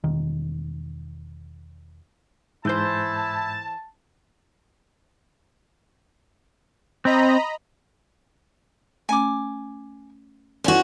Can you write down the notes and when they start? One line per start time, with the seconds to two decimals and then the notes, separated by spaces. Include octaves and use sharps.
0.04 E1 D#3
2.65 G#2 E3 E4 C5 A5 G6
7.05 C4 D#5 A#5 B5
9.09 A3 C#4 G#5 D6
10.64 C#4 E4 F#4 B4 C5 D5 G#5